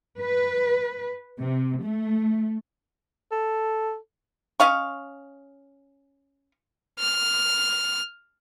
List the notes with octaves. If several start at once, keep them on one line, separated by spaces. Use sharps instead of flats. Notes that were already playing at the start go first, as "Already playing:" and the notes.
B4
C3
A3
A4
C#4 D#5 F5 C#6
F6